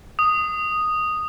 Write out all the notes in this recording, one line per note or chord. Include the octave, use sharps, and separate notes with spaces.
D#6